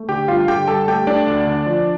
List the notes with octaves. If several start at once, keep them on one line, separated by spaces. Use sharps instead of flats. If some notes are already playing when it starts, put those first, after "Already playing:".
Already playing: A3
D3 G4 G5
G2 F4 F5
D3 G4 G5
G2 A4 A5
A3 G4 G5
A3 D4 D5
D2
D3
F3